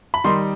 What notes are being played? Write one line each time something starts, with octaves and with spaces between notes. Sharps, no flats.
B5
D#3 G3 D#4 C6